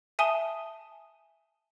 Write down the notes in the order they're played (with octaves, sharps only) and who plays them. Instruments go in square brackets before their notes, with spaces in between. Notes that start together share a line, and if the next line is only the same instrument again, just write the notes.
[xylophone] E5 G#5 A5 D#6 D#7 G7